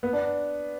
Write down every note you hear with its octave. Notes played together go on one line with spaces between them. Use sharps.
B3
D4